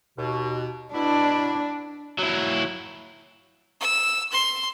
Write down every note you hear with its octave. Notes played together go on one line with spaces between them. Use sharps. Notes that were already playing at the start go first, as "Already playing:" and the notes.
D#2 B2
B2 D4 E4
F#3 E4
E6
C6